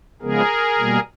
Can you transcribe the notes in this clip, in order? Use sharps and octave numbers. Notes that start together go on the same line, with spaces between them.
C#3 F3 G#3 B3 G#4 A#4
B2 G3 A#3